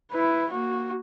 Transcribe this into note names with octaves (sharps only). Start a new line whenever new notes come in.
E4 B4
A#3 F#4